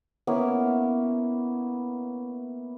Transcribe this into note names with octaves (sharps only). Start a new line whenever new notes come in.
A#3 B3 C#4 E4